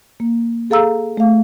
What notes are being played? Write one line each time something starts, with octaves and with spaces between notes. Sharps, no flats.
A#3
G#4 A4 F5 A#5 E6
A3 F5